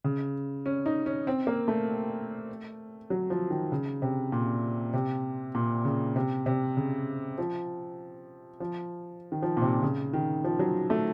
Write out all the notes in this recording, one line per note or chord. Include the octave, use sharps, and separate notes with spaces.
C#3
C#4
D#4
C#4
C4
A#3
A3
F#3
F3
D#3
C#3
C3
A#2
C3
A#2
C#3
C3
C3
C#3
F3
F3
D#3
F3
A#2
C3
C#3
D#3
F3
F#3
A3